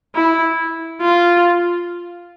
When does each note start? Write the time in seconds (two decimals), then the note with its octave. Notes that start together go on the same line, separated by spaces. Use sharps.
0.15 E4
1.01 F4